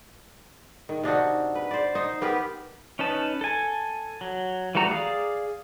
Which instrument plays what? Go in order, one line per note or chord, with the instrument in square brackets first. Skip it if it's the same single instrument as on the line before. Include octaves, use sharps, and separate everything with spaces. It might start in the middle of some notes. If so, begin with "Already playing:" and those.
[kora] D#3
C3 D4 D#4 F#4
B4
C5 D5
D#4 C5
B3 G4 A#4 B4
[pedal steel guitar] C#4 D#4 B4 A5
A4 G#5
F#3
E3 G3 A3 F#4 A#5
G#4 D5 F5